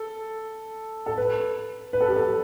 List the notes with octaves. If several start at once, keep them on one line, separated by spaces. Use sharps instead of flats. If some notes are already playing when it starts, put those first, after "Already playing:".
Already playing: A4
A4
B4
B4
A4
G4
A4